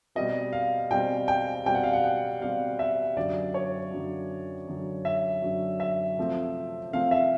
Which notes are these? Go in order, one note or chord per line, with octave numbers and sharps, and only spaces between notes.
B2 G3 C4 D#5
F5
B2 G3 C4 G5
G5
B2 G3 C4 G5
F#5
F5
F#5
F#5
B2 G3 C4 F5
E5
F#2 D3 F#3 D5
C#5
F#2 D3 F#3
F#2 D3 F#3
E5
F#2 D3 F#3
E5
C3 F3 A3 C4
C3 F3 A3 C4 F5
E5